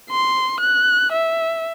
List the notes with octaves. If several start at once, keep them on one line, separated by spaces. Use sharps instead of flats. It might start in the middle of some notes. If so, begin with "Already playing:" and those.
C6
F#6
E5